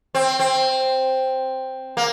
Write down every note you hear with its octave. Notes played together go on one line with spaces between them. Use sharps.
C4
C4
A#3